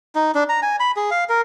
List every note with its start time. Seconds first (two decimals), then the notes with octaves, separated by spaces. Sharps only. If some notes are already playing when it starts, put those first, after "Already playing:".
0.15 D#4
0.35 D4
0.49 A#5
0.63 G#5
0.80 B5
0.96 G#4
1.11 F5
1.29 A#4